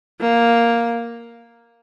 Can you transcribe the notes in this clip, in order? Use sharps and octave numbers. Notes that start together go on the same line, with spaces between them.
A#3